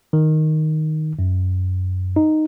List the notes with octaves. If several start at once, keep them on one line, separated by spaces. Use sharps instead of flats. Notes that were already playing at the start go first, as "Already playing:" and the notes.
D#3
F#2
D#4